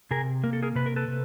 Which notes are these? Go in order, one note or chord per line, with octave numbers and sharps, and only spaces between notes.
C3 G#4 A#4
A#3 A#4
A4
G#4 A#4
C3 B4
A#4
A4 B4
C3